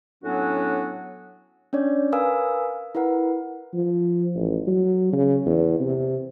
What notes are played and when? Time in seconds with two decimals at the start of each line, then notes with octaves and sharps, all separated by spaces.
0.23 A2 F#3 B3 C#4 D4 F#4
1.73 C#4 D4 C#5 D5
2.12 A#4 B4 F5 G#5 D#6 E6
2.95 E4 A#4 B4 F#5
3.73 F3
4.35 A1
4.67 F#3
5.12 C#3
5.46 E2
5.80 C3